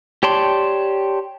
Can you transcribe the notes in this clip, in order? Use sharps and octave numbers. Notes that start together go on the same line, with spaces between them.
G4 C#5 D5 A5 C6